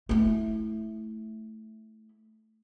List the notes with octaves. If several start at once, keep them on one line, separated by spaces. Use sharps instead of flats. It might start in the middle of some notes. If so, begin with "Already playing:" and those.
A3 E4